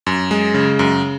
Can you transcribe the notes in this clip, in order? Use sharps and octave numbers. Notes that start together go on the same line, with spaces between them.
F#2
G#3
C#3
F#2